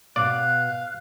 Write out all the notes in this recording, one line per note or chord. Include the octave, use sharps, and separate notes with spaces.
B2 B3 D5 F5 F#6